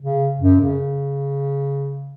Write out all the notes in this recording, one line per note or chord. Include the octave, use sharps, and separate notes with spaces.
C#3
F#2
C#3